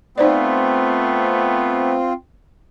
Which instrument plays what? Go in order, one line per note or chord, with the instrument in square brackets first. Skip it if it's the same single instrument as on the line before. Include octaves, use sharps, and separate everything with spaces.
[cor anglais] A3 [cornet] B3 [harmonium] C4 F4 [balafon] D#4 C5 D5